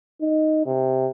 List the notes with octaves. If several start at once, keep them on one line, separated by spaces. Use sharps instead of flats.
D#4
C3